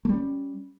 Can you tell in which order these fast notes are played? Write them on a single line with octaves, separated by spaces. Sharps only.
A3 G3 C#4